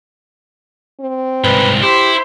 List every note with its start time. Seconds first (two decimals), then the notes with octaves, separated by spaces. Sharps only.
1.01 C4
1.44 C2 G#2 B4
1.82 E4 G4 C5